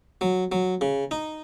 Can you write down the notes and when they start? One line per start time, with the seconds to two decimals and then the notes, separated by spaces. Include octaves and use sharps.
0.21 F#3
0.52 F#3
0.81 C#3
1.11 D#4